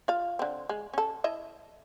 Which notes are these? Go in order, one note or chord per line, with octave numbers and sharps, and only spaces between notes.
F4 F5
D3 C4
G#3
C#4 A4
E4 D#5 E5